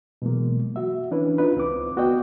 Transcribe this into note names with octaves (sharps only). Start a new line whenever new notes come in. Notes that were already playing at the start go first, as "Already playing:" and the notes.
B2 E3 F#3 G#3 A#3
F#4 E5
E3 C#4 D4 E4 B4
C4 D4 D#4 F4 B4
C#2 C4 B4 D6
B3 F#4 D5 D#5 G5